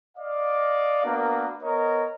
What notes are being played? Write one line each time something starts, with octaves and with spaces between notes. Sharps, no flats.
D5 D#5 F5
A#3 B3 D4 F#4 A#4
B3 A#4 C#5 D#5